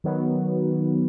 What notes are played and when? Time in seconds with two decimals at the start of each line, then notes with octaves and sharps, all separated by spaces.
0.04 D#3 F#3 B3